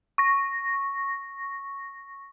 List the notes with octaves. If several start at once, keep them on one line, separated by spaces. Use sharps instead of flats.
C#6 A#6